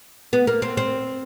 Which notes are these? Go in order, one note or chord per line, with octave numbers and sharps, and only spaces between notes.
B3
A#3
C4
C4